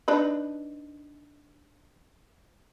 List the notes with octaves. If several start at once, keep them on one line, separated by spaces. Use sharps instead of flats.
D4 D#4 B4